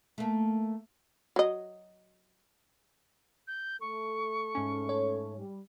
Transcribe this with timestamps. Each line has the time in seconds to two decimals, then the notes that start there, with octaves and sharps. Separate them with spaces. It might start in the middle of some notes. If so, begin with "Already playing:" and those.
0.18 A3 A#3
1.36 F#3 D#5
3.47 G6
3.81 A3 A4 C#6
4.55 G#2 C#4
4.89 C#5
5.38 G3